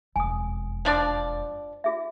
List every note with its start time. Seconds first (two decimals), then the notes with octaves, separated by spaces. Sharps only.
0.16 E1 F2 G#5 D#6
0.85 F3 D4 D5
1.84 F4 G#4 E5